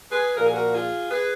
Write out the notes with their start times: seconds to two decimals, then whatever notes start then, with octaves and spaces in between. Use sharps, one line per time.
0.11 G#4 B4
0.36 A#2 F3 A#4
0.45 G#4
0.54 F#4 A#4
0.73 F4 G#4
1.11 G#4 B4